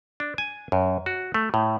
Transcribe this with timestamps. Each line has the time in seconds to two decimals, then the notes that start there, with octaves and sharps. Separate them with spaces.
0.20 D4
0.38 G#5
0.72 F#2
1.06 F#4
1.34 A3
1.54 A2